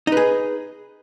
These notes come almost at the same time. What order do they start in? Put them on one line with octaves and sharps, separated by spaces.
D#4 B4 G#4